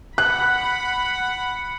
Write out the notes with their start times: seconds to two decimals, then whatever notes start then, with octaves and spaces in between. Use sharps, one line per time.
0.18 F#5 B5 F#6